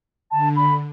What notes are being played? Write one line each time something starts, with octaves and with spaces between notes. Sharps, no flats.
D3 A5
B5